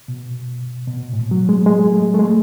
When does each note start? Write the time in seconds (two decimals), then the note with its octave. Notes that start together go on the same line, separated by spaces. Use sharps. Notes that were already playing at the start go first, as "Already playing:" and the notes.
0.08 B2
0.88 B2
1.13 A2
1.31 F#3
1.49 G#3
1.66 G#3
1.92 A3
2.14 A3
2.19 G#3